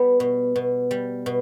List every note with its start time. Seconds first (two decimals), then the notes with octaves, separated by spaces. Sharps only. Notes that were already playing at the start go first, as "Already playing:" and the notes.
Already playing: G3 B3
0.20 B2
0.56 B2
0.91 G3
1.26 B2